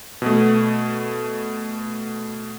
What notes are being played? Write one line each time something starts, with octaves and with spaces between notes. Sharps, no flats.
B2 A3